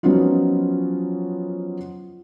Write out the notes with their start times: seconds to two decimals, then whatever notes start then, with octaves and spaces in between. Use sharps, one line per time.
0.03 F3 F#3 B3 C#4 D#4 F4